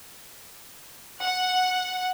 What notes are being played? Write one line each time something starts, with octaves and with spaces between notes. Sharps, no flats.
F#5